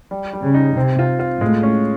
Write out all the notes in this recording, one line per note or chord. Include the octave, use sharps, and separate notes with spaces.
G3
G3
C#3
D#4
C3 C4
F4
F4
A2 G#3
C#4